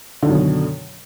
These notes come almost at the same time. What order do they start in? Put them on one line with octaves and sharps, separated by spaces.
D3 D#3 F#2 B2